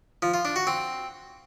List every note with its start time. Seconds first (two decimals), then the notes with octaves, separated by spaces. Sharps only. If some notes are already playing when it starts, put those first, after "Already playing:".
0.22 F3
0.34 F4
0.45 D4
0.56 F#4
0.67 C4